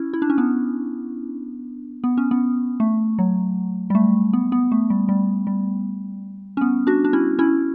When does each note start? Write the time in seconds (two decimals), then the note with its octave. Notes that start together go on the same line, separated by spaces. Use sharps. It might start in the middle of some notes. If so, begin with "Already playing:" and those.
Already playing: C#4 E4
0.13 E4
0.22 D4
0.30 C#4
0.38 B3 D4
2.04 B3
2.18 C#4
2.31 B3
2.80 A3
3.19 F#3
3.90 G3
3.95 A3
4.33 B3
4.52 B3
4.72 A3
4.90 G3
5.09 G3
5.47 G3
6.57 C#4
6.61 B3
6.87 D4 F#4
7.05 D4
7.13 C#4 E4
7.39 C#4 E4